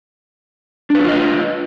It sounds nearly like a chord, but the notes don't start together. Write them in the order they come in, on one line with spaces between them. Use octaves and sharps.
D4 B4 F#4 F4 D#5